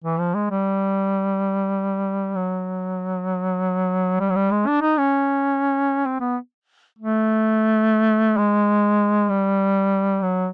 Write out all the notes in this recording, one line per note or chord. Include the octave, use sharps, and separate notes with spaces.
E3
F3
G#3
G3
F#3
G3
F#3
G3
G#3
D4
D#4
C#4
C4
B3
A3
G#3
G3
F#3